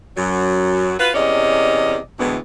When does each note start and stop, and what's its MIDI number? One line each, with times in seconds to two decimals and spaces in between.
0.17 0.94 42
0.17 0.94 54
0.99 1.10 65
0.99 1.10 66
0.99 1.10 71
1.15 1.98 40
1.15 1.98 48
1.15 1.98 61
1.15 1.98 74
1.15 1.98 75
2.19 2.37 38
2.19 2.37 45
2.19 2.37 52
2.19 2.37 56
2.19 2.37 59